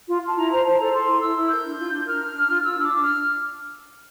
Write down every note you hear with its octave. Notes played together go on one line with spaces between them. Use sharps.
F4
F4
A5
E4 A#5
C5 A#5
C5 A5
A4 A#5
A4 C6
E4
E4 E6
E4
A#4 G6
D4
F4
D4
A#4 F6
D4
D4
F4
F4 E6
D4
D6
D4
F6